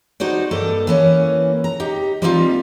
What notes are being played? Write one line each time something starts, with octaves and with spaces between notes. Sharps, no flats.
D#4 F#4 C5 D5
G2 A#3 A4 D#5
E3 A#3 C#4
A#5
D#4 G4
G3 G#3 A#3 C4 D#4 F4